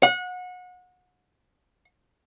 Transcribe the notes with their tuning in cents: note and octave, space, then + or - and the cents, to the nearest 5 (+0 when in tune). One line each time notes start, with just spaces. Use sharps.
F#5 -30